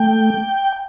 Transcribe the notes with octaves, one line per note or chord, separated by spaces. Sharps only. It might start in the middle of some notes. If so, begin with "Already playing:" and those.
Already playing: A3 G5